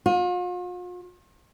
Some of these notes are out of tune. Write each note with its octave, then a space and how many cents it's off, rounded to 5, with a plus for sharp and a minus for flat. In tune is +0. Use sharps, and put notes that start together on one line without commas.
F4 +45